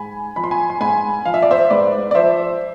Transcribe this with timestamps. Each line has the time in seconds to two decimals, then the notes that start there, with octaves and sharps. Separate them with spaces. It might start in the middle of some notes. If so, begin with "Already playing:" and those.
Already playing: G#2 G#5 B5
0.36 F3 B5
0.44 C6
0.51 G#5 B5
0.70 C6
0.81 G#2 G#5 B5
1.25 F3 F5
1.34 E5
1.42 D5
1.51 C5 E5
1.70 G#2 B4 D5
2.11 D5
2.15 F3 C5 E5